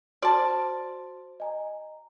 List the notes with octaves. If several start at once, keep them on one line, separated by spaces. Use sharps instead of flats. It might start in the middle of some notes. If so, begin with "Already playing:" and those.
F#4 C5 D5 A5 C6
D#5 G#5 A#5